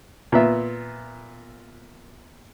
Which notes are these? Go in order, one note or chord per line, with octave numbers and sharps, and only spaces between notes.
A#2 B3 E5